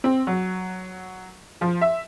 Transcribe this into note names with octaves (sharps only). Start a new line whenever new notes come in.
C4
F#3
F3
E5